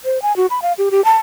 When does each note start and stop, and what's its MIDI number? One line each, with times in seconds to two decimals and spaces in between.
0.05 0.21 72
0.22 0.35 80
0.36 0.46 66
0.50 0.60 83
0.62 0.73 77
0.78 0.89 67
0.91 1.03 67
1.05 1.16 81